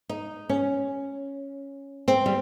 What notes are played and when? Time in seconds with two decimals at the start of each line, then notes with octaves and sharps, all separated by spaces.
0.09 D#4
0.49 C#4
2.08 C4
2.26 G3